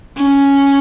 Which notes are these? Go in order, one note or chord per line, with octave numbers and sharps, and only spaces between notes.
C#4